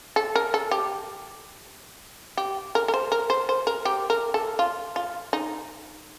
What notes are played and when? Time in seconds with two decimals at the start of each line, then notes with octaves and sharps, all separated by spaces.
0.16 A4
0.36 A#4
0.54 A4
0.71 G4
2.38 G4
2.75 A#4
2.88 A#4
2.94 C5
3.12 A#4
3.30 C5
3.49 C5
3.67 A#4
3.85 G4
4.10 A#4
4.34 A4
4.59 F4
4.96 F4
5.33 D#4